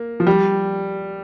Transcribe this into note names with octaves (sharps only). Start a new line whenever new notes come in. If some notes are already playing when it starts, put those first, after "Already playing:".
Already playing: A#3
F3
G3